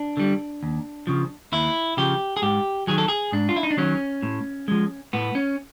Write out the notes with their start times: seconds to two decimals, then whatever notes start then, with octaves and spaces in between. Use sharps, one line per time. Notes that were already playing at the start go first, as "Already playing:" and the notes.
Already playing: D4
0.17 D3 G3
0.63 D#2
1.07 C#3 F3
1.52 D#2 E4
1.97 C#3 F3 G4
2.37 G#4
2.42 G#2 G4
2.87 D#3 F#3 G#4
2.98 A4
3.08 G#4
3.32 G#2 D4
3.49 F4
3.56 E4
3.63 D#4
3.71 D4
3.77 D#3 F#3 C#4
4.23 A2
4.68 F3 G#3
5.13 A2 B3
5.35 C#4